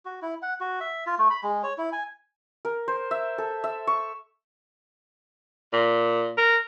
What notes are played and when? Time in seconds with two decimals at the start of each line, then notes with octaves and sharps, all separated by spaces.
0.05 F#4
0.22 E4
0.42 F#5
0.61 F#4
0.81 E5
1.07 F4
1.19 A3
1.30 B5
1.43 G#3
1.64 C#5
1.78 E4
1.92 G#5
2.65 A#4
2.88 C5
3.11 E5
3.38 A4
3.64 E5
3.87 C#6
5.73 A#2
6.38 A#4